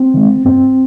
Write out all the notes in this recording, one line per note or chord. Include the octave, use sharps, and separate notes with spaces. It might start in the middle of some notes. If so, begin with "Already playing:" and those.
Already playing: C4
D#3 G#3
G2 C4